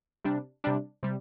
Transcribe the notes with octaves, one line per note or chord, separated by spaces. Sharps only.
C3 G3 D4
C3 G3 D4
C3 G3